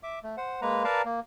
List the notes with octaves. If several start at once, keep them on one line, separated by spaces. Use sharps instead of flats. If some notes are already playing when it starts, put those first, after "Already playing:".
E5 D6
A3
C5 F#5
G#3 A#3 B4 A#5
A#4 B4 D5 F5 A5 A#5
A#3